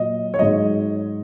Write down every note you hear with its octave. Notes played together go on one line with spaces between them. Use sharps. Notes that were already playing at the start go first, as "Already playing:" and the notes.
Already playing: A#2 F#3 D#5
C#5
G#2 F#3 D#5